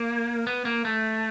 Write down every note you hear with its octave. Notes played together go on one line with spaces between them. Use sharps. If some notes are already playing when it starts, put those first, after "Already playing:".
Already playing: A#3
B3
A#3
A3